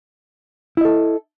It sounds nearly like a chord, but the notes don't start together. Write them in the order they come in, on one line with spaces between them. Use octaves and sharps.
E4 D#5 A4